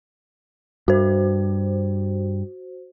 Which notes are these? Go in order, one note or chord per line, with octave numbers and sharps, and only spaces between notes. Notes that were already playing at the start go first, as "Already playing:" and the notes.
G2 F#4 C5